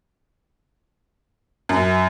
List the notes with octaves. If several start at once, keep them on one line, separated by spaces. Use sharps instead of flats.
F#2